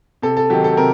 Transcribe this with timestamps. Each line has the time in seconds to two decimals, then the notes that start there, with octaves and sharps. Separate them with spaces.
0.22 C3 A4
0.37 A4
0.50 D#3 F#3 G4
0.64 A4
0.77 C3 A#4